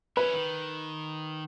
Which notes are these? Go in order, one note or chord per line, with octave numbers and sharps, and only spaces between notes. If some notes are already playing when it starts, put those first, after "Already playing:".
C#4 E4 B4
D#3